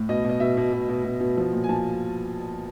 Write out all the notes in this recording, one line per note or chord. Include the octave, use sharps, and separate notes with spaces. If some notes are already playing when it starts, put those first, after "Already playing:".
Already playing: A2
B2 D#5
B2
D#5
B2 E5
B2
B2
B2
B2
B2
F3
A#2
G#5
F3 A5